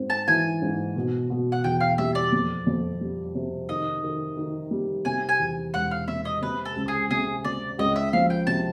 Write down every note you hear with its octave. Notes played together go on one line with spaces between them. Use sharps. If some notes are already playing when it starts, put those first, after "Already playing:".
Already playing: G#2 C4
A5
E3 G#5
G#2
B2
B2
F#5
E2 G5
F5
G3 E5
D5
F2
F2
G3
C3
D#3 D#5
D#3
D#3
G3
C3 G#5
G#5
E2
E1 F#5
F5
C3 E5
D#5
C3 B4
A4
C#2
G#4
C3 G#4
C3 D5
C#2 D#5
E5
F3 F5
G5
C3 A5